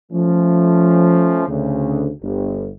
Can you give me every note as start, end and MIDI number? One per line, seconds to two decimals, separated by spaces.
0.11 1.42 53
0.11 1.42 57
0.11 1.42 61
1.47 2.08 38
1.47 2.08 49
2.21 2.67 31